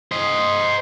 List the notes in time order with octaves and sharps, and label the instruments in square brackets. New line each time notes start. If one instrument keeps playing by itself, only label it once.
[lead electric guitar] C5 D#5